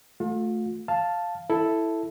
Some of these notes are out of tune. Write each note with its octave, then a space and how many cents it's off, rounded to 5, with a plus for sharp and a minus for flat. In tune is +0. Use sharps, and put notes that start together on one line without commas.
A3 +0 F4 +40
F5 +0 A5 +0
E4 +0 A4 +0